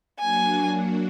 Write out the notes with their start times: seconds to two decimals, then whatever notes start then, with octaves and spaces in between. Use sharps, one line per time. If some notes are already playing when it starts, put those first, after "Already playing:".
0.19 F#3 A#3 D4 F#4 G#5